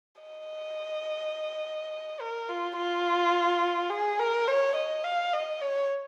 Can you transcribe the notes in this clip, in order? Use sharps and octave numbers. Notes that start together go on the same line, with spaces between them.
D#5
A#4
F4
F4
G#4
A#4
C#5
D#5
F5
D#5
C#5